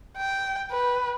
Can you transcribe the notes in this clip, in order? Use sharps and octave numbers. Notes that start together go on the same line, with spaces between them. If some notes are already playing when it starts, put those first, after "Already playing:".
G5
B4